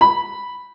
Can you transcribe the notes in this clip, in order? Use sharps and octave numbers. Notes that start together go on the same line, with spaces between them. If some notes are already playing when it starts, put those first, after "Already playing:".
B5